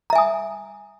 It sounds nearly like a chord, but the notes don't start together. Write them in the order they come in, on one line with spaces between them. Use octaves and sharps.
A#5 E5 G#5 D#6